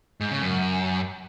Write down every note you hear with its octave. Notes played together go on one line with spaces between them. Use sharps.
G#2
C#3
F#2